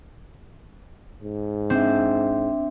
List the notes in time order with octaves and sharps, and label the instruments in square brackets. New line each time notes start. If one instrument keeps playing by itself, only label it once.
[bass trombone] G#2
[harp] C4 [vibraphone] D4 E5